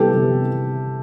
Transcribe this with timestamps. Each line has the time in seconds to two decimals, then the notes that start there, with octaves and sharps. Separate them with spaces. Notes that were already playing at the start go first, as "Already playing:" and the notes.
Already playing: C3 E3 G3 B3 G4 A4
0.13 C3 E3 G3 B3